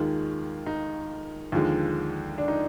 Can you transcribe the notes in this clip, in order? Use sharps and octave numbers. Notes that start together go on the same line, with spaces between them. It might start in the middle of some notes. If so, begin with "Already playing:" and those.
Already playing: D#2 D#3 G#3 F4
D#4
D#2 D3 F3 G#3
D4
D#4